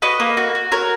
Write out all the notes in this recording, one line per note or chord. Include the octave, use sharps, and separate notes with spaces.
F#4 B4 D#5
A#3
F#4
F#4
F#4 A#4 C#5